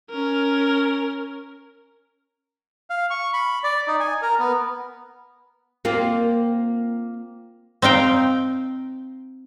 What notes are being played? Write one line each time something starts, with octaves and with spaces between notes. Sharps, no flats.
C#4 A#4
F5
C#6
B5
D5
D#4
G#5
A#4
B3
A#3 C4 F4
C4 D#4 F5 G5